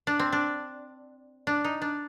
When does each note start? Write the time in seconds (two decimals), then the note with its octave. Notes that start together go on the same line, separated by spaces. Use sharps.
0.07 D4
0.19 C4
0.32 D4
1.47 D4
1.64 D#4
1.82 D4